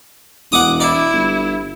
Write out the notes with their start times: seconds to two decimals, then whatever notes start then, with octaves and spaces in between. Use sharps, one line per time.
0.52 E1 F#5 D6 D#6
0.80 E4 D5
1.12 G1